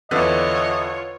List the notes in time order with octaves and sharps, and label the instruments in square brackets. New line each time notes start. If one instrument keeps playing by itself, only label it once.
[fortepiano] E2 D3 [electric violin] F4 C#5 [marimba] B4 [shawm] D#5